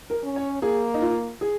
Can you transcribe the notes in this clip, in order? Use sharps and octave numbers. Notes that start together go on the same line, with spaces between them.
A#4
C#4
C#5
A#3 G#4
D#4
F4
G#4